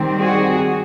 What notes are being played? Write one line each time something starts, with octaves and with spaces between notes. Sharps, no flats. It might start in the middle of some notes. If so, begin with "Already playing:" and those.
Already playing: D#3 G3 C4
F#4 G#4